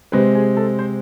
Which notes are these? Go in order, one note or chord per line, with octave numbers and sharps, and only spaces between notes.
C3 G#3 C4 B4
G#4
A4
C5